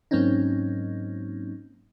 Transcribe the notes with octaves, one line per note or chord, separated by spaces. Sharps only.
G#2 F#3 A#3 C4 C#4 D#4